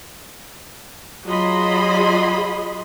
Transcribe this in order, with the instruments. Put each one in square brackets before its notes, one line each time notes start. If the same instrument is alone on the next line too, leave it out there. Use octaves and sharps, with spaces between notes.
[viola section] F#3 F4 G#4 D#5 B5 C6